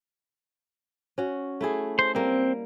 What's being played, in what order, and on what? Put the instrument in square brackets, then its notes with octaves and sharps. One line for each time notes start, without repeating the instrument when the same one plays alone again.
[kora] C#4 F#4
A3 E4 G#4
[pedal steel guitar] C5
[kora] G3 A#3 [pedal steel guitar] C4